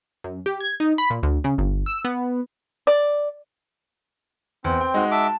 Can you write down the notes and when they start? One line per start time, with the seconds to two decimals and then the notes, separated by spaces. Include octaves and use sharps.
0.24 F#2
0.46 G4
0.60 G#6
0.80 D#4
0.98 B5
1.10 A#2
1.23 D2
1.44 C#3
1.58 G1
1.86 E6
2.05 B3
2.87 D5
4.64 E2 C4
4.81 G5
4.94 G#3 D#4 F#4
5.11 E5 A5 D6